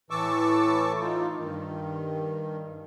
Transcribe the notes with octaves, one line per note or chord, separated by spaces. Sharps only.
A2 E3 A5 C#6 D6 E6
D#4 F4
G2 D#3